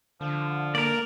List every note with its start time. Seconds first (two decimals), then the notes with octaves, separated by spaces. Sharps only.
0.21 D3 F3
0.75 A#3 A#4 D5